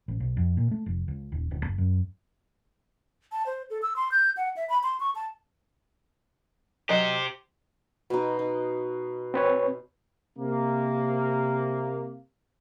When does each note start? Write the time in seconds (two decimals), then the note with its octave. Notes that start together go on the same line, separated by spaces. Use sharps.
0.08 A1
0.20 B1
0.37 F2
0.57 A#2
0.71 A3
0.86 F1
1.08 C#2
1.32 D#1
1.51 D1
1.65 F#1
1.78 F#2
3.32 A5
3.46 C5
3.70 A4
3.82 E6
3.96 C6
4.12 G6
4.37 F#5
4.56 E5
4.70 B5
4.83 C6
5.00 C#6
5.15 A5
6.89 F#3 G4 C5 D#5
8.10 B2 D#4
8.39 D#4
9.34 C4 B4 C#5
10.38 C3 A#3